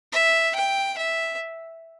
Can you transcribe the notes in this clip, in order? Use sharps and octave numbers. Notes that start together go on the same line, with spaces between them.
E5
G5
E5